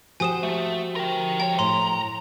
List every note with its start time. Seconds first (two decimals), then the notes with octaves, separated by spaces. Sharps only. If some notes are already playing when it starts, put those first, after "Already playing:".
0.20 F3 F#4 G4 C5 G#5 D#6 E7
0.43 A3
0.96 A#4 G5
1.40 C#2 C#5 G5
1.59 A2 A#5 C6